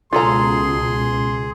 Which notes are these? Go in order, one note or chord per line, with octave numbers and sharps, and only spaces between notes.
C#2 B2 F4 G#4 A4 A#5 C6